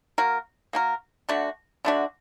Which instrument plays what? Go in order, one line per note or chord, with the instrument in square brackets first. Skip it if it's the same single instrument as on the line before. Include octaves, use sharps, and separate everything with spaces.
[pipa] A#3 F#4 A#4
A#3 F#4 A#4
D3 A3 D4 F#4
D3 A3 D4 F#4